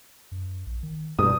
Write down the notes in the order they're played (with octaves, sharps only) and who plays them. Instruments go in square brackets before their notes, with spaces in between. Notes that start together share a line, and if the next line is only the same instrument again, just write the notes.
[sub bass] F#2
A#1
D#3
[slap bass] G2 [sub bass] B2 [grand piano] D#6